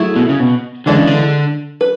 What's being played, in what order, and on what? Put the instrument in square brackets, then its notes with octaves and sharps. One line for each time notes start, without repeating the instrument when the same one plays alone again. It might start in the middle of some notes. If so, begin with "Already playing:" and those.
Already playing: [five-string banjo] F#3 A3 E4 G#4
[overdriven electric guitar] B2
C#3
B2
[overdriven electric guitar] D3 [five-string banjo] E3 G#3 D4
[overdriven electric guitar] C#3
D3
[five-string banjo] B4